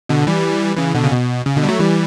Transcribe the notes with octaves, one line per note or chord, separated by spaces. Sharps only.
B2 D3
E3 G3
C#3 E3
B2 D3
C#3
B2
C#3
B2 D3
G3
F#3 A3
E3 G3